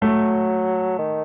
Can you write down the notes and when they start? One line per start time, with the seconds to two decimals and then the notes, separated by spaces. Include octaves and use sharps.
0.02 F#3 A3
0.99 D#3